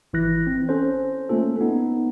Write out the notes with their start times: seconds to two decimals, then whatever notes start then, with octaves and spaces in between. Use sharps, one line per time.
0.13 G#1 E3 E4 F#6 A#6
0.47 C4
0.69 C#4 A4 C5
1.29 A3 A#3 C#4 F4 A4
1.61 B3 D#4